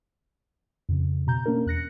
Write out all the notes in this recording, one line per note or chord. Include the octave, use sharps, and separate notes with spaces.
F2 C#3
B2 A#5 G6
A#3 C#4 D4 A#4
E2 F#6 A#6 C#7